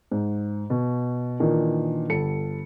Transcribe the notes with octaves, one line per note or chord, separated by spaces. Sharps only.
G#2
B2
A#2 D#3 E3 D4
G1 A4 C#7